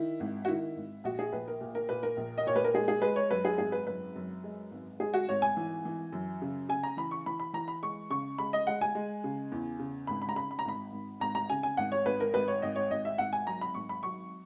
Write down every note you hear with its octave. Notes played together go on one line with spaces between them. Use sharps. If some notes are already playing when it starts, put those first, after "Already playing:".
Already playing: D#3 E4
G#1
F#4
D#3 E4
G#1
A#1 F#4
G#4
A#1 B4
A#4
A#2
A#4
A#2 B4
A#4
A#1
D#5
A#2 C#5
B4
A#4
G#3 G#4
G#4
G#3 B4
C#5
F#2 B4
G#4
G#1 G#4
B4
F#2 B4
F#2
G#3
G#1
G#3 G#4
F#4
G#1 C#5
G#5
E3
E3
F#2
C#3
C#3 G#5
A#5
E3 B5
C#6
E3 B5
B5
E3 A#5
B5
G#3 C#6
C#3 C#6
G#3 B5
D#5
G#3 F#5
G#5
G#3
C#3
E2
C#3
G#1 B5
B5
A#5
C#3 B5
B5
A#5
G#1 B5
G#1
G#1 A#5
A#5
C#3 G#5
G#5
G#1 F#5
C#5
G#1 B4
A#4
G#1 B4
C#5
G#1 D#5
C#5
G#1 D#5
E5
G#1 F#5
G#5
F#3 A#5
B5
G#1 C#6
B5
F#3 C#6